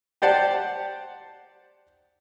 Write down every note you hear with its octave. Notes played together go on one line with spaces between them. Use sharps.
G4 C5 D5 F#5 A5